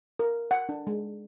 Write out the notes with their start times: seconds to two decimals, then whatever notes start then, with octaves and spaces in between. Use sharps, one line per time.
0.19 A#4
0.51 F#5
0.69 D4
0.87 G#3